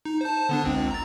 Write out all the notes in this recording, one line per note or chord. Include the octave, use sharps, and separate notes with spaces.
D#4
C5 A5
D3 B3 D4
G1 C#2 C4
A#5 A6